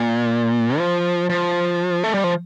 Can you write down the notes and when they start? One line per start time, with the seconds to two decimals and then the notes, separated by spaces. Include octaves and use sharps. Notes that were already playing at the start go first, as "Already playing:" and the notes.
Already playing: A#2
0.78 F3
1.29 F3
2.04 A3
2.14 G3
2.24 F3